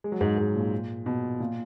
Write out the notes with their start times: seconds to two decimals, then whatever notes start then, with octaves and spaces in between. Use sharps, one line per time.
0.04 G#3
0.12 F#3
0.21 G#2
0.38 G#2
0.55 A#2
1.06 B2
1.40 A#2